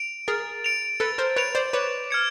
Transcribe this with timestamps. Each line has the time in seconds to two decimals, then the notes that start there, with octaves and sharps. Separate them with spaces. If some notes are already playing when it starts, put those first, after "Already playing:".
Already playing: D7 F7
0.28 G#4 A#4 A6
0.64 D7 F7
1.00 A4 B4 A6
1.18 A#4 C5
1.36 B4 C#5 D7 F7
1.55 C5 D5
1.73 B4 C#5 D6
2.10 F6 G#6 C#7